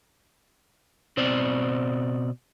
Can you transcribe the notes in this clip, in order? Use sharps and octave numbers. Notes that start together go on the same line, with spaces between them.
B2 C4 C5 D5